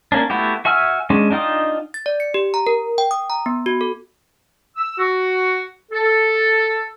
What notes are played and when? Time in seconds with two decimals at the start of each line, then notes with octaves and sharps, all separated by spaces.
0.12 A#3 C#4 D4
0.30 A3 B3 E4 F#4 G4
0.65 F#4 E5 G#5 E6 F6
1.10 G#3 C#4 D4
1.31 D4 D#4 F4 G5 D#6
1.94 A6
2.06 D5
2.20 C#7
2.34 G4
2.54 A#5
2.67 A#4
2.98 G5
3.11 D#6
3.30 A#5
3.46 B3
3.66 F#4
3.81 A4
4.76 E6
4.98 F#4
5.92 A4